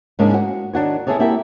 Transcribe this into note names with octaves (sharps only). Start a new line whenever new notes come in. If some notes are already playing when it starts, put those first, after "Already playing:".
G#2 C#3 G#3 A#3 C#4 D4
F#4
D#3 D4 F#4 C#5
B3 E4 G#4 A4 C#5 D5
A#3 E4 F#4 G4 A4 E5